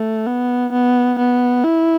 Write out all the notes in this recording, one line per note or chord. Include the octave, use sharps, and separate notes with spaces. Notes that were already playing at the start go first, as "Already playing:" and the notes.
Already playing: A3
B3
B3
B3
E4